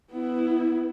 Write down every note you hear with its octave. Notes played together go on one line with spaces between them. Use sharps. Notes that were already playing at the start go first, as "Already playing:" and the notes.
B3 E4